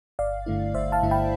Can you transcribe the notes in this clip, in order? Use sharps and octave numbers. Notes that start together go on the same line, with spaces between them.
G1 D5 F5
G2 D3 A3 E4
G1 C5 E5
F5 A5
G2 D3 A3 E4
G5 B5